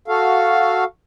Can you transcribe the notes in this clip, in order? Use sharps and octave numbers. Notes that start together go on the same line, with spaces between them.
F#4 A4 F5